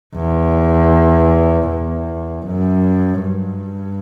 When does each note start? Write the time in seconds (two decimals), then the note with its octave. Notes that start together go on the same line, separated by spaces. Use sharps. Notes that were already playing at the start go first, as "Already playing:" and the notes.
0.15 E2
1.68 E2
2.46 F#2
3.22 G2